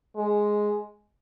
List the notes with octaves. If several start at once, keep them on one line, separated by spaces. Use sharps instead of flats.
G#3